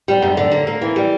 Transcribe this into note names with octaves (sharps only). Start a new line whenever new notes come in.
G3
F#2
D3
A#3
A#3
E3
G3